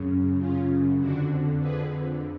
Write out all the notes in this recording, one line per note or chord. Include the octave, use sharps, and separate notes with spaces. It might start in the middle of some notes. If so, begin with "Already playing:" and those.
Already playing: F#2 C#3
C#4 F4
F2 D3 D4 F#4
G#4 B4